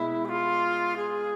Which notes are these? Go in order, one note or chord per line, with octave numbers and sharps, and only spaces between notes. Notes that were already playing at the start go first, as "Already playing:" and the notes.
Already playing: B2 G#3 E4
G#4
F4
G#4